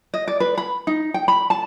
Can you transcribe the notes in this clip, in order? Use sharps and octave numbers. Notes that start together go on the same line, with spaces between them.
D#5
D5
B4
B5
D#4
G5
B5
A5